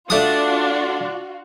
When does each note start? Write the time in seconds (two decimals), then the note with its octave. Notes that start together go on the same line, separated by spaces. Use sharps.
0.10 A3 D4 F4 F#4 D#6